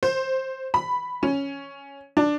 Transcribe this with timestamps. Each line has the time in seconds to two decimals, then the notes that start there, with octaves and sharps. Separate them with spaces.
0.03 C5
0.74 B5
1.23 C#4
2.17 D4